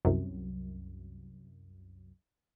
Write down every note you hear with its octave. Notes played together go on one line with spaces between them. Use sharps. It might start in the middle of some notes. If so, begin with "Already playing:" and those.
C2 F#2